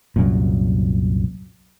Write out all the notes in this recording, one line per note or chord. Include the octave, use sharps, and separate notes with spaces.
C2 F#2 A#2